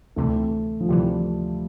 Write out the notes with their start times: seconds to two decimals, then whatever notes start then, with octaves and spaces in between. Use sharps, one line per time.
0.16 D2 C3 E3 A3
0.80 F3
0.89 D2 C3 E3 G3